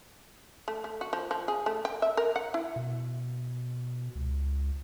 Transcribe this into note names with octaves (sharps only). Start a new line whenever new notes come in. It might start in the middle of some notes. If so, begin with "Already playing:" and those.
A3
A3
F#4
F3
F3
G#4
A3
G5
E5
A#4
F#5
E4
B2
C#2